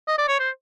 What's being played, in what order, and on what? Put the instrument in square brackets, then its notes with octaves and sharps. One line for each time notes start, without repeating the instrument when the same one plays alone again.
[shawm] D#5
D5
C#5
C5